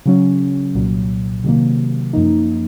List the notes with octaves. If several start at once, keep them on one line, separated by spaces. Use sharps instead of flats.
C#3 F#3 C#4
C2 A#2 F#3
C3 D#3 F#3 A#3
F#2 F3 A#3 D#4